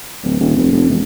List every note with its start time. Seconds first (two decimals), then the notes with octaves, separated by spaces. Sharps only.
0.23 D1
0.40 D#1
0.57 F1
0.73 F1
0.90 E1